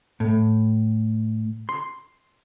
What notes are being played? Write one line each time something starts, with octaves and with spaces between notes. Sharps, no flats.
A2
C6